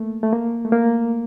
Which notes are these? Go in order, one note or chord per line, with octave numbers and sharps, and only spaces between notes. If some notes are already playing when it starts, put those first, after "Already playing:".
Already playing: A3 A#3
A3
A#3
A3
A#3